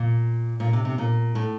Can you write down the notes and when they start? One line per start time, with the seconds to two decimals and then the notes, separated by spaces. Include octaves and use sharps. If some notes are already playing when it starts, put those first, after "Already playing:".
Already playing: A#2
0.60 A#2
0.73 C3
0.85 C3
0.98 A#2
1.35 A2